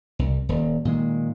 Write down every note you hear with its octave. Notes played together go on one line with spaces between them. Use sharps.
C2
D#1
A#2 D#3 G#3